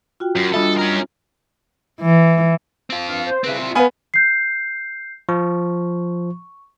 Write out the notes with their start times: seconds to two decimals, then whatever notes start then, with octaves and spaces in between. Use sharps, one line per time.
0.20 F4 F#4 G5
0.36 F#2
0.54 G3 D4 F4 A4 D#5 E5 B5
0.79 C#4 A#4
2.00 E3
2.90 C4 F4
3.07 G2 F5
3.27 C5
3.44 C#3 C4 E4 B4
3.60 F4
3.75 B3 B4 F5 G#5 D#6
4.14 G6 C7
5.29 F3 C#6